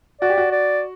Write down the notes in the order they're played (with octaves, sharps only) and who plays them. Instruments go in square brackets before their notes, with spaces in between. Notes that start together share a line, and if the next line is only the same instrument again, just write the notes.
[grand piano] F#4 [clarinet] D5
[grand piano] G4
F#4
[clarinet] D5